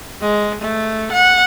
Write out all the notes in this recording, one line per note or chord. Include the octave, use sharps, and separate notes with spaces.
G#3
A3
F#5